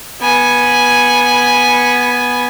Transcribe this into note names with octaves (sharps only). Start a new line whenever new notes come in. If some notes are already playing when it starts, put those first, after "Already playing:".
B3 G#5